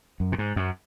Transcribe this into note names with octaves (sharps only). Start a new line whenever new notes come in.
F#2
A#2
G#2
F#2